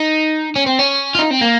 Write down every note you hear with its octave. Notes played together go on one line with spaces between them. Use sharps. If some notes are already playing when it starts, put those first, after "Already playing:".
Already playing: D#4
C#4
C4
C#4
F4
D#4
C4
A#3